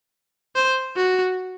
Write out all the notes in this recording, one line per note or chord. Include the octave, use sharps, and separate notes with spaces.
C5
F#4